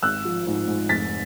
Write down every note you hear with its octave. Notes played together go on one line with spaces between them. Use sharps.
G#1 E6 F#6
F3
G#2
G#2
F1 A6 B6